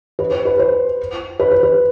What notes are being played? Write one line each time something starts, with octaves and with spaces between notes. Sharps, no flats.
B4
C5
B4
C5
B4
C5
B4